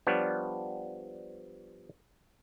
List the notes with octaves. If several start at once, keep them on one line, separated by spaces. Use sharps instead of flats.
F3 G3 B3 D4 C#5 D5